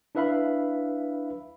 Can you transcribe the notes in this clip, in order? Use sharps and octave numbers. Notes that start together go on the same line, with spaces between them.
D4 E4 B4 E5 F5 B5